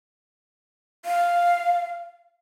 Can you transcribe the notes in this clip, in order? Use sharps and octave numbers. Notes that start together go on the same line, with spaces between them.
F5